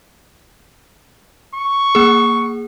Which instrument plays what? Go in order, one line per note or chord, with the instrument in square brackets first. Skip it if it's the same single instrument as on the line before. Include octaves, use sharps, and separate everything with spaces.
[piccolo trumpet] C#6
[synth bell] A#3 G#4